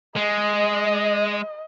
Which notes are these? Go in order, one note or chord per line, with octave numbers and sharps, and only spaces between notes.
G#3 D#5